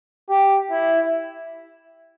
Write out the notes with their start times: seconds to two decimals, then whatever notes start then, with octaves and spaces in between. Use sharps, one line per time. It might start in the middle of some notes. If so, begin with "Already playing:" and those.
0.29 G4
0.71 E4